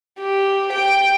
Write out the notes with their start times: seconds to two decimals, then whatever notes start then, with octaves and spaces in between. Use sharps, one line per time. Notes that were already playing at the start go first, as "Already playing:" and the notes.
0.19 G4
0.73 G5